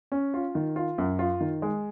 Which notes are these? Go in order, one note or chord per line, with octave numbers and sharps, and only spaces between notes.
C#4
F4
D#3
F4
F#2
F4
D#3
G#3